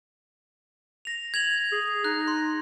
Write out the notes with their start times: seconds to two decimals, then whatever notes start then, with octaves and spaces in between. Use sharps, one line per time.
1.05 A#6 F7
1.34 G#6 F7 F#7
1.72 G#4
2.04 D#4 F#6
2.28 C6